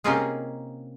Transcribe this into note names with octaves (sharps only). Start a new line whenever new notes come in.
C3 A#3 C#4 D#4 F4 G#4